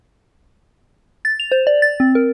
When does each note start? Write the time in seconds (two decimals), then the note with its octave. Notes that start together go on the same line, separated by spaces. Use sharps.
1.25 A6
1.40 F7
1.52 C5
1.67 D5
1.82 A6
2.00 C4
2.15 A#4